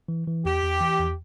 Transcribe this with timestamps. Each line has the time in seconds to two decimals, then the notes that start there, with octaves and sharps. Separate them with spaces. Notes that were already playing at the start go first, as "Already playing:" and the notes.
0.08 E3
0.27 E3
0.45 E2 G4
0.63 E2
0.81 E3
0.99 E2